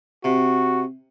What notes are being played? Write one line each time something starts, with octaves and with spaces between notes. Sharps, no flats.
C3 F#4